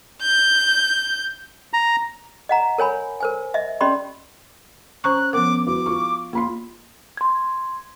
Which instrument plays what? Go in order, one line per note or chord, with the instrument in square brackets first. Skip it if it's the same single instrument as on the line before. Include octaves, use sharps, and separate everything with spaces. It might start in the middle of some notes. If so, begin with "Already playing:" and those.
[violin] G6
[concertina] A#5
[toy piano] D#5 F#5 A#5
A#4 C#5 G#5 B5
A#4 C5 G#5
D#5 E5
C#4 G4 D5 D#5 B5 C6
[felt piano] C#4 [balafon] C5 A#5 C#6 [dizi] F#6
[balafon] F3 B3 A#4 [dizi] D6
[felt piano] E4 F#4 B4 [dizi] D6
[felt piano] F4 C#6
[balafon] A#3 [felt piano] F4 B5 C6
[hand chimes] C6 G#6